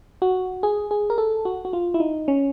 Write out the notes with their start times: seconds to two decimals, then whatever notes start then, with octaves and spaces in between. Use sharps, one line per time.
0.22 F#4
0.63 G#4
0.91 G#4
1.10 A#4
1.18 A4
1.45 F#4
1.65 F#4
1.73 F4
1.94 E4
2.00 D#4
2.28 C#4